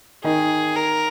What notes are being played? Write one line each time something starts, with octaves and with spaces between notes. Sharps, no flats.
D#3 D#4 G#4
A#4